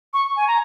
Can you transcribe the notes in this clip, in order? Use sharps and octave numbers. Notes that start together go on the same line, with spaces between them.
C#6
G#5
A#5